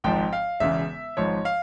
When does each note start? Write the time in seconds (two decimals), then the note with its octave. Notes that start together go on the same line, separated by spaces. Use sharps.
0.04 G#1 G#2 F3 G5
0.33 F5
0.60 E1 E2 C#3 E5
1.17 G#1 G#2 F3 C#5
1.45 F5